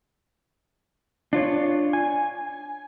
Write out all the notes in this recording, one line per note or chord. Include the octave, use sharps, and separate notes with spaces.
D4 F4 C#5
G#5